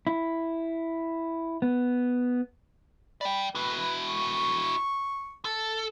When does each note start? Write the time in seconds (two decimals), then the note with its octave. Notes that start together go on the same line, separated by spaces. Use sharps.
0.07 E4
1.62 B3
3.21 D5 G5 B5
3.55 E4 F#4 B4
4.09 C#6
5.45 A4 A5